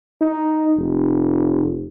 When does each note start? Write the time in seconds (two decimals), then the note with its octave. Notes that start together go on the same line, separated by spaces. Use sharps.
0.21 D#4
0.78 F1